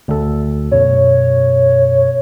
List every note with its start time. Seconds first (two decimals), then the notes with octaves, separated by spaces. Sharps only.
0.08 D2 A4
0.72 F#2 B2 C#5